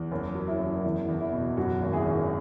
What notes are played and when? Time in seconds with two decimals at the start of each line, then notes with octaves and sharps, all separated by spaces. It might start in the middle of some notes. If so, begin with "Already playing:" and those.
Already playing: E2
0.11 F#1 C#4
0.35 F#3
0.48 E4
0.59 F#1
0.84 E2 E4
1.08 E2
1.20 E4
1.32 B2
1.57 F#2 C#4 F#4
1.81 G#1
1.93 E4 G#4
2.06 G#1